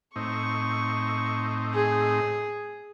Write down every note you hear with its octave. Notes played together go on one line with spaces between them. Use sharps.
A2 C4 D#4 C#6
G#4